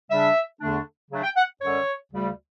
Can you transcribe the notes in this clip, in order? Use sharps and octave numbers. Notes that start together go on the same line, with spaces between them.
C#3 G3 D4 E5
E2 D3 A3 D4
C#3 F#3 A3 D4
G5
F#5
F#2 D3 G3 C#5
D2 C#3 G3